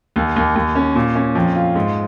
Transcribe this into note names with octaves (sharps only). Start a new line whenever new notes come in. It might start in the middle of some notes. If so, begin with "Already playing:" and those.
D#2
D#2
D#2
C#4
A#2
C#4
F2
F4
G#2